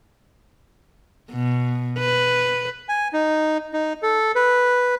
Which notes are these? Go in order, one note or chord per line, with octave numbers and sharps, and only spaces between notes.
B2
B4
G#5
D#4
D#4
A4
B4